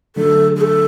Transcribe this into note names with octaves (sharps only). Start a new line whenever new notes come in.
D3 F#3 A3 D4 A4
G#4
A4